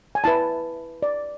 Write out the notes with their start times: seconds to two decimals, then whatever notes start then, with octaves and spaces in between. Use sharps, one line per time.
0.15 G#5
0.24 E4 B4 A5
1.03 D5